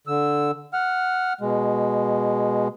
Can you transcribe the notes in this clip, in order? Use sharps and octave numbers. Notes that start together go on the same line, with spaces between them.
D3 E6
F#5 F6
B2 G#3